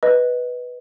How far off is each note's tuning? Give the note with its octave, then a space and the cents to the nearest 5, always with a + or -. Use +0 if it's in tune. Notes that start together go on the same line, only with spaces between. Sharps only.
B4 +0 D#5 +0